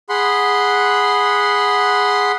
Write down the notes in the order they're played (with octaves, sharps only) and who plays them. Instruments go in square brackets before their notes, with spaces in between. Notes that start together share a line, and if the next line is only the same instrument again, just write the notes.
[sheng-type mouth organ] G#4 F#5 B5 C6